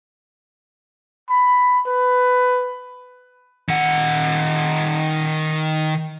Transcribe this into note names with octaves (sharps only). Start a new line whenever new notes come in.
B5
B4
D#3 F#5